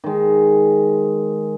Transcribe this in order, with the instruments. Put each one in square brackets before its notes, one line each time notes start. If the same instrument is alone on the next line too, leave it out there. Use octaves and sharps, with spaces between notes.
[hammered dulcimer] D#3 G#3